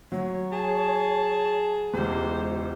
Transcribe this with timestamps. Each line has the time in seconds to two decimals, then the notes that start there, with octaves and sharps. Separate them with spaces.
0.12 F#3 C#5
0.52 G#4 A5
1.94 E1 C#2 G4 C5